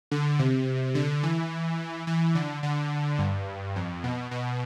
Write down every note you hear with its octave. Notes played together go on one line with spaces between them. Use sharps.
D3
C3
D3
E3
E3
D3
D3
G2
F2
B2
B2